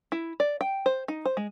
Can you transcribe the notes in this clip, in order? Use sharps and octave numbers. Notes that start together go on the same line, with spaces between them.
E4
D5
G5
C5
D#4
C5
G#3